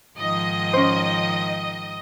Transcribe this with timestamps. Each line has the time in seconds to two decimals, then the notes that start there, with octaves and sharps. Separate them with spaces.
0.19 G#2 D#3 F3 D#5
0.73 C#4 C5